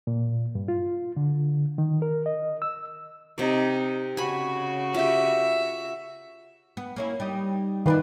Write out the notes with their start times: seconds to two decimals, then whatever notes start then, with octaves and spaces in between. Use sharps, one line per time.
0.07 A#2
0.55 G2
0.68 F4
1.16 D3
1.78 D#3
2.02 A#4
2.26 D#5
2.62 E6
3.38 C3 D#4 D5
4.17 C#3 F#4 G#5 B5
4.94 F4 G4 E5
6.77 B3
6.96 A#3 C#4 E4
7.20 G3 D#4 D#5
7.86 D#3 D4 D#4 F4 B4